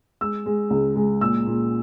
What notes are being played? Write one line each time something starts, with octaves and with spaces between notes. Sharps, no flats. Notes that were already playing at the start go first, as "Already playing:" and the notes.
G#3 E6
G#3
C#2
G#3
A#2 E6
A#2